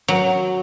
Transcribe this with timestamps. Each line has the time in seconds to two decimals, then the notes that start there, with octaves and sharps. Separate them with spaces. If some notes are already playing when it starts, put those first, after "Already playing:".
0.08 F#3